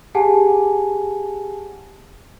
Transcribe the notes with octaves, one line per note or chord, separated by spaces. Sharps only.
G4 G#4 F#5 G#5 A5